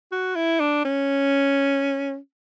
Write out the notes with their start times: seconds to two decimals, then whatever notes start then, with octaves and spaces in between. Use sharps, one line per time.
0.12 F#4
0.35 E4
0.61 D4
0.85 C#4